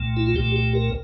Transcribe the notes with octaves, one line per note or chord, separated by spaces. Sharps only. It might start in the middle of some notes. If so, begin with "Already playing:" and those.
Already playing: C2 A#2 A3
E4
F4
C2 A#2 A3 G4
G4
A#4